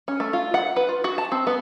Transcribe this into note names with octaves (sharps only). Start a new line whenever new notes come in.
C#4
A3
F4
F#5
B4
F4
F#4
A5
C4
B3